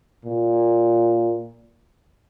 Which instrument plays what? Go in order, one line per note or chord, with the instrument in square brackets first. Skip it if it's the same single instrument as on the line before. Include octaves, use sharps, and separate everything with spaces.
[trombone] A#2